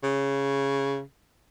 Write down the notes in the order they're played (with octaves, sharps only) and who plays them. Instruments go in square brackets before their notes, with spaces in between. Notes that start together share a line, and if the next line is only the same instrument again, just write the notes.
[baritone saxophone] C#3